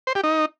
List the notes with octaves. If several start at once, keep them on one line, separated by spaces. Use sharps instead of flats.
C5
G4
D#4